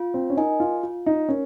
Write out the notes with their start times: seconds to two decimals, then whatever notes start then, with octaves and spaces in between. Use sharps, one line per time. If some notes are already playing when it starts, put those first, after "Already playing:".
Already playing: F4
0.14 C4
0.30 C#4
0.37 D#4 A#4 D#5 G#5
0.60 F4
0.83 F4
1.06 D#4
1.29 C#4 A#4